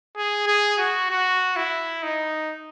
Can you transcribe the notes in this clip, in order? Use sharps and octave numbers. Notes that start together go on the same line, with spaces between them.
G#4
G#4
F#4
F#4
E4
D#4